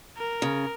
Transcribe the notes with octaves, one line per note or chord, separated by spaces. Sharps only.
A#4
C#3